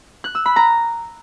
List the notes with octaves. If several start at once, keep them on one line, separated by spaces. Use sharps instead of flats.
F#6
E6
B5
A#5